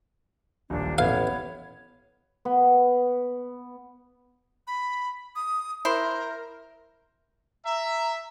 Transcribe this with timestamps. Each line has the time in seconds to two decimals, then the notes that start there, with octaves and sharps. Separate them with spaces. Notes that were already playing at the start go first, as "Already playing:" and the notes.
0.70 D#1 A#1 D4
0.98 A1 B3 C#5 F5
2.45 B3
4.67 B5
5.36 D#6
5.85 E4 A#4 C5
7.65 E5 A#5